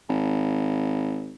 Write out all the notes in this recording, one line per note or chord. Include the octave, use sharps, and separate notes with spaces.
G#1